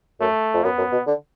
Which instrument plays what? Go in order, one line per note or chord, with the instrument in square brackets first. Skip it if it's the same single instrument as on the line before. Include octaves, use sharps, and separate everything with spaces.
[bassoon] F#2 [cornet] A3
[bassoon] F2
[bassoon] F#2 [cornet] B3
[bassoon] F#2
B2
D3